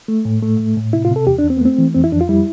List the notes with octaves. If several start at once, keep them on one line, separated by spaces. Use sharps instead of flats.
A3
A2
A3
A2
A2
C3 E4
F4
C3
A4
E2 G4
D4
E2
C4
B3
A3 C4
E3
F2 C4
E4
F2 D4
F4
G3 E4